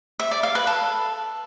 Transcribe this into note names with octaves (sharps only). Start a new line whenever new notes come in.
E5
D5
F5
B4
A4